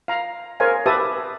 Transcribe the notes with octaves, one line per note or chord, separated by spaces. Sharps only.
F5 A#5
G#4 A#4 C5 C#5 F5 G#5
G4 B4 E5 A5 D#6